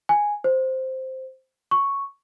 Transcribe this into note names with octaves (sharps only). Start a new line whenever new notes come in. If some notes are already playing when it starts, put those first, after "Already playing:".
G#5
C5
C#6